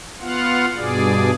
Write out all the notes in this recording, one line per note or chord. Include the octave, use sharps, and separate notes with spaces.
B3 F4 F5 F#5
G2 B2 G#4 D5